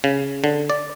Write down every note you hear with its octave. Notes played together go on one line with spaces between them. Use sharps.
C#3
D3
D5